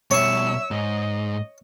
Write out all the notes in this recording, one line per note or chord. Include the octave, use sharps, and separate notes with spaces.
B2 G3 C#5 E5 C#6 E6
G#2 D#5